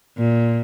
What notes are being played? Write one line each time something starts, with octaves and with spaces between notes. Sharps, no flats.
A#2